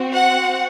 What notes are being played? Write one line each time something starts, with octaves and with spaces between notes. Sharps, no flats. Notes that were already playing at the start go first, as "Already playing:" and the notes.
Already playing: C4 F#4
F#5